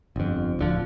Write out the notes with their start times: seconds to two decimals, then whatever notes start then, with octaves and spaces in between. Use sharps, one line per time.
0.16 G1 F2
0.59 D1 D3 F3